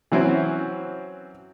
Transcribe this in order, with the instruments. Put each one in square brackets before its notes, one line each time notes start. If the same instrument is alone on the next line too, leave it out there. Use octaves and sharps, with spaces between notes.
[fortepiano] E3 F#3 C4 C#4 E4